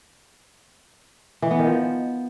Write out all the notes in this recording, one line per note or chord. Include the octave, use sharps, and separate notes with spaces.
E3
B3
D#3
F3